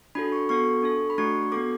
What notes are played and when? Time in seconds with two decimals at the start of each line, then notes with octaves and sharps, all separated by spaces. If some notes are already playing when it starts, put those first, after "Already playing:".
0.15 D4 F#4 A4 B5
0.32 C#6
0.49 B3 F#4 A4 C#6
0.83 D4 A4
1.10 B5
1.18 A3 D4 F#4 C#6
1.52 B3 F#4 A4 D6